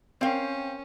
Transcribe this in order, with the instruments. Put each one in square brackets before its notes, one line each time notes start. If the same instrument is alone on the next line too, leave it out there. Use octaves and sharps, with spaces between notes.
[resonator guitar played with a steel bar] C4 F5 [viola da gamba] C#4 [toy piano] A#4 C5 G5